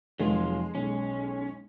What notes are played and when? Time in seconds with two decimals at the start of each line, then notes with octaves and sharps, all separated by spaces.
0.20 F1 F#3 G#3 F4
0.75 B1 C#4